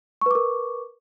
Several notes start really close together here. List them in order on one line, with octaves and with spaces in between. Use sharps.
C#6 B4 D6 A#4